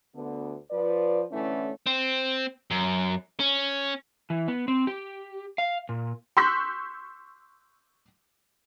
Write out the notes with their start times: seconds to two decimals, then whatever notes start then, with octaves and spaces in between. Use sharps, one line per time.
0.15 D2 D3 B3
0.71 F3 B4 D5
1.32 A2 D3 E3 A3 C#4
1.86 C4
2.71 F#2
3.40 C#4
4.30 E3
4.48 B3
4.68 C4
4.87 G4
5.58 F5
5.89 A#2
6.37 C6 C#6 E6 F#6 G6 B6